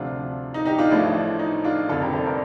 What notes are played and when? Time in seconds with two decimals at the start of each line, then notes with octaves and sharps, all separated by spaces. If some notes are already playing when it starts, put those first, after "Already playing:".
Already playing: D2 C3 F3 D4 F4
0.54 D#4
0.66 D#4 G4
0.78 D4 F4
0.90 A1 A2 F3 A3 D4
1.39 D#4
1.64 D4 F4
1.89 F1 F2 D3 F4 A4
2.02 G4 A#4
2.13 A4 C5
2.26 A#4 D5